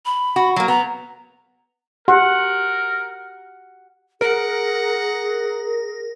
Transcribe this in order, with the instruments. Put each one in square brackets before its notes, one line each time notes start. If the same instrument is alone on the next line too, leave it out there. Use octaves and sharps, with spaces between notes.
[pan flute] B5
[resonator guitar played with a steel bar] F#4
F#3 A#3
[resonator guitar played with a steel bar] B3 [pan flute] A#5
[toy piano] G4 [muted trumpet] A#4 [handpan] F#5
[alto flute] G#4 [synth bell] A#4 [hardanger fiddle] F#5